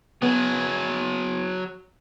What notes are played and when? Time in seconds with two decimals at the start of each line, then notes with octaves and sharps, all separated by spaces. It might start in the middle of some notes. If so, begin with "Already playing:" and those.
0.22 F#3 B3 G#4